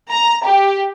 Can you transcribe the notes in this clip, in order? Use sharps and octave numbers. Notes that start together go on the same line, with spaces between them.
A#5
G4